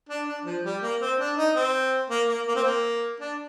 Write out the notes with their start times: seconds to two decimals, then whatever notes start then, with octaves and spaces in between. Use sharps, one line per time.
0.09 D4
0.27 D4
0.45 F3
0.64 G3
0.82 A#3
1.00 C4
1.19 D4
1.37 D#4
1.55 C4
2.10 A#3
2.29 A#3
2.47 A#3
2.55 C4
2.64 A#3
3.20 D4